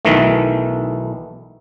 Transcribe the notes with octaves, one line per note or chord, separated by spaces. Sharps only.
B1 D#3 E3 A3